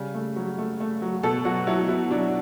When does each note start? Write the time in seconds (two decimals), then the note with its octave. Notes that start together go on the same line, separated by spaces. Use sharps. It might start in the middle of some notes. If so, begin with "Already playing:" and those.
Already playing: C#3 G3
0.14 A3
0.36 F#3
0.58 A3
0.80 A3
1.02 F#3
1.23 B2 A4
1.45 F#3 F#4
1.67 F#3 E4
1.88 F#3 E4
2.10 F#3 D4